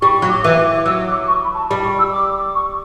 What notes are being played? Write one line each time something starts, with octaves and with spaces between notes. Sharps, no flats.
G3 C#6
C#6
F#3
D6
E3 D6
D6
F#3 E6
D6
C#6
B5
A5
G3 B5
C#6
E6
D6
C#6